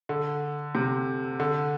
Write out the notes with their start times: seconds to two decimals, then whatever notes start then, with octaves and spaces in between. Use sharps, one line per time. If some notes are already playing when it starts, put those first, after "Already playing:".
0.09 D3
0.75 C3
1.40 D3